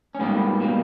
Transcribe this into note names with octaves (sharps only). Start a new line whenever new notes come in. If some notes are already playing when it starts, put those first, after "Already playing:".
C#4
G#2 G3 A#3 B3
B2 G3 A#3